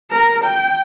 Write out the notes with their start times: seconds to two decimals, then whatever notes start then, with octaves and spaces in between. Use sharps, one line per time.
0.11 A#4
0.44 G5